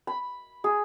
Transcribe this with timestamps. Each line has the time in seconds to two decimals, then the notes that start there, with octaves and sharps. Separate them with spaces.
0.07 B5
0.64 G#4